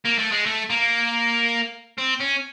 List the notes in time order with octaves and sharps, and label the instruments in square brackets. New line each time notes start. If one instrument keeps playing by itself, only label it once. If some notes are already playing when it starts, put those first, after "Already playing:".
[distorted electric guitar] A#3
A3
G#3
A3
A#3
C4
C#4